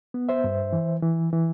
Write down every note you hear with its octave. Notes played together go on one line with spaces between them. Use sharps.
B3
C5 E5
G2
E3
E3
E3